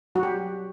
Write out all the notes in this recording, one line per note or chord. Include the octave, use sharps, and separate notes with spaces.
F#3 F#4
G4